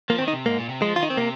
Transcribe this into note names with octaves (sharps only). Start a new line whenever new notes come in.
F3 A#3
C4
D#3
D#4
C3
G#2 A#3
A#2
C3
F3 G#3
F4
D#3 D#4
C4
C3 A#3